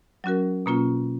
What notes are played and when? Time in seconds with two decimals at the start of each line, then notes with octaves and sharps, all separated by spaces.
0.24 F#3 C#4 F#4 A#4
0.66 B2 A#3 C#4 F4